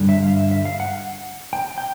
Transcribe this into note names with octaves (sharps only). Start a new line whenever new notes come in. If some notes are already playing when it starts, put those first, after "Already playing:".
Already playing: G2 D3 G3
E5
F5
E5
E5
F5
F#5
G5
G5